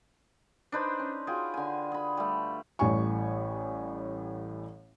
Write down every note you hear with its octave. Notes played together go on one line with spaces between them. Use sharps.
D4 D#4 B4 C5
C#4
F4 F#4 G#4 G5
D3 G#5
G#4 B5
G3 A3
A1 A2 G3 G#5 C#6